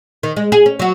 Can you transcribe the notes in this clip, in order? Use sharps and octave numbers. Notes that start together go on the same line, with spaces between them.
D#3
G#3
G#4
C#4
F#3 F#4